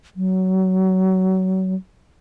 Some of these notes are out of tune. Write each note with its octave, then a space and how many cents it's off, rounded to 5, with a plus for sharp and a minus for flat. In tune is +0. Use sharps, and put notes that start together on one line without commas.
F#3 +25